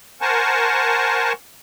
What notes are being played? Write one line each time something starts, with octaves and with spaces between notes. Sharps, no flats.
A#4 C5 F#5 G#5 A5 C#6